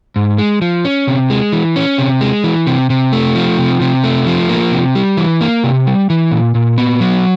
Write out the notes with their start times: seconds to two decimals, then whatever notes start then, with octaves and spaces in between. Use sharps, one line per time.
0.16 G#2
0.38 G#3
0.62 F3
0.85 C#4
1.08 C3
1.30 G#3
1.52 E3
1.76 C#4
1.98 C3
2.21 G#3
2.44 E3
2.67 C3
2.90 C3
3.13 A3
3.35 F3
3.58 C3
3.81 C3
4.04 A3
4.27 F3
4.49 A#3
4.72 C3
4.95 G3
5.17 E3
5.41 A#3
5.64 C3
5.87 G3
6.10 E3
6.32 A#2
6.55 A#2
6.78 B3
7.01 F#3